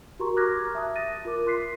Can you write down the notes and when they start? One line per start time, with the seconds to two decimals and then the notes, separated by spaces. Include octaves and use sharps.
0.19 F#4 G4 A#4 A#5 C6 C#6
0.36 A#5 D6 F6 F#6 G#6 A#6
0.75 E5 A5 D#6
0.96 A6 A#6 D#7
1.25 F4 A#4 D6
1.47 C6 F#6 B6 C7